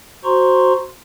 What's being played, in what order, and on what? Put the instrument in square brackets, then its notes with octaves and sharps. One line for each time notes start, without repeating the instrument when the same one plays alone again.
[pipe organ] F#4 C5 A#5 C6 C#6